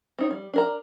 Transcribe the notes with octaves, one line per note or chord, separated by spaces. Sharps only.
C4 D#4 C#5
G3
D4 A#4 A#5